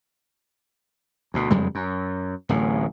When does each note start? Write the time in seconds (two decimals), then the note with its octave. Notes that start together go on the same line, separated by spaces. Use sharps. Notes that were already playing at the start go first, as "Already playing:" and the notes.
1.34 D2 B2
1.50 F#1 F2 G3 G#3
1.75 F#2
2.49 D1 A1 A2